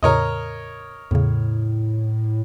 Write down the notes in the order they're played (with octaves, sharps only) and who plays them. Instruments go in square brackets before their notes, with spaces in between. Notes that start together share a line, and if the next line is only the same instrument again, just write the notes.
[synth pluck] E2 A2 C#3 [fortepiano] A#4 C#5 D#5
[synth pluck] E2 C#3 [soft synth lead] A2